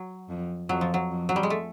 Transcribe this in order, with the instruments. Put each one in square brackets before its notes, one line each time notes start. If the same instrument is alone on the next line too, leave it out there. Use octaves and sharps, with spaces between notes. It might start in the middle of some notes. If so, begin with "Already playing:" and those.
Already playing: [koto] F#3
[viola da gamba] F2
[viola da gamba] F2 [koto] F#3
[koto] F3
F#3
[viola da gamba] F2
[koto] F#3
G3
G#3
A3